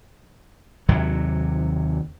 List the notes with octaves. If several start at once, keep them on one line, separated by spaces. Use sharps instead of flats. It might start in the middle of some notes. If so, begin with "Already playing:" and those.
D#2 C3 F#3